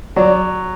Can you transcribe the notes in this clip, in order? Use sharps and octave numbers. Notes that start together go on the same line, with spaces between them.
F#3 D5